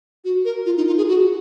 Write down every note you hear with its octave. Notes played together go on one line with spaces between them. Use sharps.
F#4
A#4
F4
D#4
F4
G#4
F#4